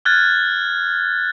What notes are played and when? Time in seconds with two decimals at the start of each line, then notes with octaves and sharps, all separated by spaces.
0.05 F6 F#6 G#6 A6